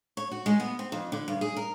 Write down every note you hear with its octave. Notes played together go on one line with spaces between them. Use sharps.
C#5
F#4
G#3
B3
C4
F2
D3
G2
G#4
A#4